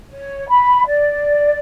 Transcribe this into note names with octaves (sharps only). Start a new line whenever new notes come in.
C#5
B5
D5